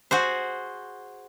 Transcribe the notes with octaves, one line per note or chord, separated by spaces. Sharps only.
F#4 G#4 C5